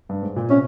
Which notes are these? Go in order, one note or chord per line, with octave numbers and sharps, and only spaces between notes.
G2
G#2
A#2
C3 C#4